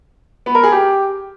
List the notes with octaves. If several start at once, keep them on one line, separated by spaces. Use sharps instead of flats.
B3
A#4
G#4
G4